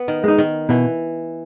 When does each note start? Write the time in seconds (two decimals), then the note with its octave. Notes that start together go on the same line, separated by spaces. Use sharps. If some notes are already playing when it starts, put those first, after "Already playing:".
Already playing: B3
0.08 D#3
0.24 G#3 D#4
0.38 D#3
0.69 B2 E3